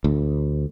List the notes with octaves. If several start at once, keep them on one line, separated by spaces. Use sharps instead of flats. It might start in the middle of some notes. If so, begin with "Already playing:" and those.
D2